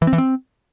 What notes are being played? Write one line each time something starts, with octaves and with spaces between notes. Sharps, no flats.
E3
C4
E3
C4